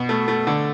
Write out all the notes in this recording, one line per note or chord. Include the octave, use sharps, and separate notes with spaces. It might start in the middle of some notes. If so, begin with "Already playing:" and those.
Already playing: B2
A3
A3
D3